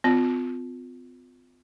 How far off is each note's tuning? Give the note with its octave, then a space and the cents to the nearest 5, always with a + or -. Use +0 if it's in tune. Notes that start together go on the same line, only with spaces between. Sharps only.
C4 -45 F4 +15